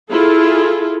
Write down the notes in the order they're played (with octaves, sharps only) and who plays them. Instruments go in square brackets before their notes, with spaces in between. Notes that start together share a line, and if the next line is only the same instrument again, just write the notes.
[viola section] E4 F4 G#4 A4